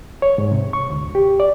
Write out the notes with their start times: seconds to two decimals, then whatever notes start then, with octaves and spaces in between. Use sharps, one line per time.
0.22 C#5
0.38 G#2
0.52 C3
0.73 C#6
0.90 D2
1.15 G4
1.40 D5